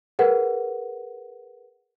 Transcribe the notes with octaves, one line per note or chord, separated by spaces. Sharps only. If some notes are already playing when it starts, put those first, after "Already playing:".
G#4 A#4 B4 F#5